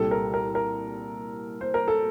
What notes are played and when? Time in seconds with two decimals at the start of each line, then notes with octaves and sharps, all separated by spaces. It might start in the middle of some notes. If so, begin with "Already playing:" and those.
Already playing: C2 A#2 G3 A4
0.11 A#4
0.34 A#4
0.55 A#4
1.61 C5
1.74 A#4
1.88 A4